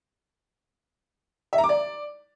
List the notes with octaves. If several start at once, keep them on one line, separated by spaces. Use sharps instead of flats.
E5
A#5
D6
D5